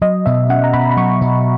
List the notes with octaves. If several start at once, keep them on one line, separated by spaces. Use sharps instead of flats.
F#3 D#5
B2 E5
C#4 F#5
A#5
B2 B5
B5
F#3 C#6
B2